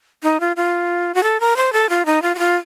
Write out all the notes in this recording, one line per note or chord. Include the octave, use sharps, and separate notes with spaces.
D#4
F4
F4
F#4
A4
A#4
C5
A4
F4
D#4
F4
F#4
F4